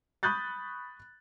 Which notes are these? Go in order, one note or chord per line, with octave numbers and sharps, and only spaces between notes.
B5 C#6 D#6 F#6 G6 A6